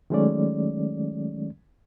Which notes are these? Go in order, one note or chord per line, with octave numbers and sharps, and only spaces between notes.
D#3 F#3 G#3 A3 C#4 D5